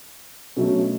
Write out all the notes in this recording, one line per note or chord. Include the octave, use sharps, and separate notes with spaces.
B2 F#3 A3 C#4